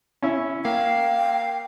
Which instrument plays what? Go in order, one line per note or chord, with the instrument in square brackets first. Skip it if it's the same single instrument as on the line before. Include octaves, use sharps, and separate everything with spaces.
[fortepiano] C#4 E4
[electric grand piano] A#3 [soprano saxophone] F5 [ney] G5